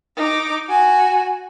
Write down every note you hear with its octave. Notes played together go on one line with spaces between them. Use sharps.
D#4 D6
F#4 G#5